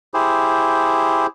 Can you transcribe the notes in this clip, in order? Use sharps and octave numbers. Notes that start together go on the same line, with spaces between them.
E4 G4 G#4 C5